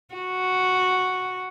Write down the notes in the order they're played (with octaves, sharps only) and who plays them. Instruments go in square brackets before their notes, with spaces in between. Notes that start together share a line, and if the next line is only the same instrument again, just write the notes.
[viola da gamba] F#4